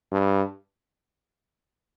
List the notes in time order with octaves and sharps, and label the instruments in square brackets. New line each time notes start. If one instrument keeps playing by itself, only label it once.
[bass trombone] G2